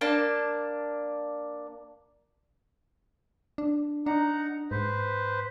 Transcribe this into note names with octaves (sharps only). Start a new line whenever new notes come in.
A#3 D4 A5
D4
D4 D#4 F#5 A#5
G#2 B4 C5